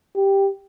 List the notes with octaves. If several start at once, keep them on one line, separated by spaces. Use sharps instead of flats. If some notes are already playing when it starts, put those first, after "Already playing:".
G4